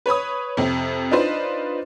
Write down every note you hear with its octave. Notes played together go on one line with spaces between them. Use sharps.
B4 C#5 B5 D#6
F2 C3
D4 D#4 F4 B4 C5